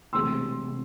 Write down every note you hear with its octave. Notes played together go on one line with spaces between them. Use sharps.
E1 D2 C3 C6 E6
C3